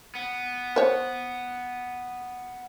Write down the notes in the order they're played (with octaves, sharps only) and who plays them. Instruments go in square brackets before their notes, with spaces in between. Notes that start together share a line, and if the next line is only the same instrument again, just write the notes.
[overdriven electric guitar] B3
[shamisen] C5 C#5